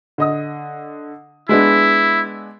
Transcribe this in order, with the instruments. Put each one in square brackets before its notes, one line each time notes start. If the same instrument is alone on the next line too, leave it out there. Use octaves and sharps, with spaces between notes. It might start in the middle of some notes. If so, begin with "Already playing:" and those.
[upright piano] D3 D#5 D#6
[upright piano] G#3 B3 D4 [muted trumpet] E4